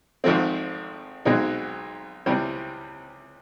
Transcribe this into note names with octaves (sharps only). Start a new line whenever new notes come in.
G#1 G#2 F3 A3 C4
B1 B2 G#3 C4 D#4
C#2 C3 E3 G3 C4